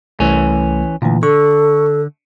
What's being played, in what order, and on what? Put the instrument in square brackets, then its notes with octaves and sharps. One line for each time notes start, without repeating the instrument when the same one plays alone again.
[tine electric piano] C2 A3 [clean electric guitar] E3 C#4
[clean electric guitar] D2 [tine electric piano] A#2 E3
[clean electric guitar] D3 [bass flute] A4 [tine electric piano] C#6